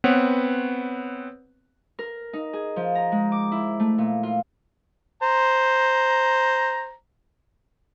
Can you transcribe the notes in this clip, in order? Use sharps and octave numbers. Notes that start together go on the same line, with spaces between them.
B3 C4 B4 C#5 F#5
A#4
D#4
G#4
F3
A#5
G#3
D6
E4
A3
A#2
F4
C5 A#5